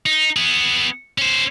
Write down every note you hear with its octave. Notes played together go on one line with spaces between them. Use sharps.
D#4
B3 G#4
C#4 C5